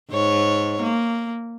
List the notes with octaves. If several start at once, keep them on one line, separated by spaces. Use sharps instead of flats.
G#2 C#5
A#3